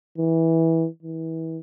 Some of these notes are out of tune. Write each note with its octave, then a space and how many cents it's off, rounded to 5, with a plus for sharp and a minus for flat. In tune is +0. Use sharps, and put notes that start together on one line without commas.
E3 -15
E3 -30